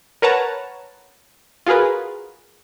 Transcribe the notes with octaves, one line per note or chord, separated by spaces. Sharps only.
A#4 B4 C#5 F#5 A5 A#5
F4 F#4 G#4 A#4 B4